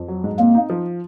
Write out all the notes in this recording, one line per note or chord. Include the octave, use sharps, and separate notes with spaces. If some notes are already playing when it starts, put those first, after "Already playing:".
Already playing: F2
F#3
G#2
A#3 C4
D#4
F3